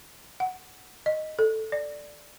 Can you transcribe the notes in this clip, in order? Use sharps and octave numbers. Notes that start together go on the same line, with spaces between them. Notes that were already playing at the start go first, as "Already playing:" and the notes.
F#5
D#5
A4
D5